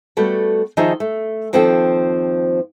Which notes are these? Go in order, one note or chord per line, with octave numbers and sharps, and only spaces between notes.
G3 A3 B3 F#4 A4
D#3 F3 D#4 G#4 D#5 E5
A3
D#2 F3 C4 A4 C5 G5